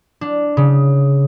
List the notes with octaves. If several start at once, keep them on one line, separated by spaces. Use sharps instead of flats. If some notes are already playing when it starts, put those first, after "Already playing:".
D4
C#3